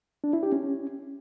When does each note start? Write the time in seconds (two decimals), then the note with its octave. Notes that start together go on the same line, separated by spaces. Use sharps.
0.24 D4
0.33 E4
0.43 G4
0.52 C#4